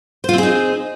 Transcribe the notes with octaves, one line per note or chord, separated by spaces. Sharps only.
C4 D#4 F4 G#4 C5